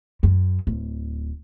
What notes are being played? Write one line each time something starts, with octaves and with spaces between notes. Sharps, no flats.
F#2
D1